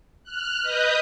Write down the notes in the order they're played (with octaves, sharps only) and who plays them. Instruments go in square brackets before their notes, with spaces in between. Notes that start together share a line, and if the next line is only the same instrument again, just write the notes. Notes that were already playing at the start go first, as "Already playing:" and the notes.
[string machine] F6 F#6
B4 D#5 D#6 G6